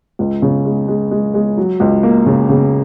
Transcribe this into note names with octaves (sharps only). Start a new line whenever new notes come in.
C#2
C#3
G#3
G#3
G#3
G#3
F#3
C#2
A#3
C#3
C#3